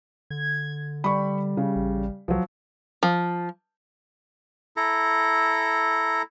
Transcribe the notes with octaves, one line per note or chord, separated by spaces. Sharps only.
D3 G#6
G3 B5 C#6
C#3
A1
C2 F3 F#3
F3
E4 A4 A#5